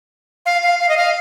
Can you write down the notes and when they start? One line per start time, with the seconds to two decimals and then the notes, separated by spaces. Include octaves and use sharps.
0.46 F5
0.63 F5
0.80 F5
0.89 D#5
0.97 F5